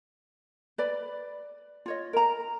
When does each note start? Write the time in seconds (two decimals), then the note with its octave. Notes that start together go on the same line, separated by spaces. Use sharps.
0.78 B4 D5 B5
1.86 F4 C#5 D#5
2.13 A#4 A#5